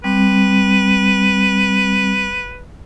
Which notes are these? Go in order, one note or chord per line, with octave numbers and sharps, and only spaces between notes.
G3 C4 B4